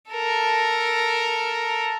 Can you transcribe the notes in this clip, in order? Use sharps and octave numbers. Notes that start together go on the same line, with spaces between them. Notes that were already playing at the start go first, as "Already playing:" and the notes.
A4 A#4